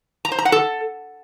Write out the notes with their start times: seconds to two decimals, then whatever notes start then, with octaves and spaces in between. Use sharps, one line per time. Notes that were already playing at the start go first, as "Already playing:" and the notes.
0.25 A#5
0.32 C5
0.39 A#5
0.45 F#5
0.52 A4